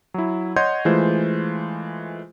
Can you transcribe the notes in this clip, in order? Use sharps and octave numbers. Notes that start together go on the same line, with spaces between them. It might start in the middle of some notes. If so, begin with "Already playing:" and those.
F#3 E4
C#5 D#5 F#5 C6 G6 G#6
E3 G#3 A3 F4 C5